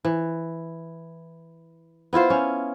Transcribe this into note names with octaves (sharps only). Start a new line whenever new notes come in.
E3
B3 E4 F4 C5
C#4